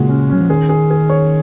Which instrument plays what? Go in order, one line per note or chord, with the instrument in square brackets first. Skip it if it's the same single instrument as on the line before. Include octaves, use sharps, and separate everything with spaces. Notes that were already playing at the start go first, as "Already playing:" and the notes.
Already playing: [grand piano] A#2 G#3 F#4 [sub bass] C#3
[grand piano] C#4
[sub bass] F#3 [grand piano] C#4
[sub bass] F3
[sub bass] D#3 [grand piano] G#4
[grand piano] G#4
G#4
C#5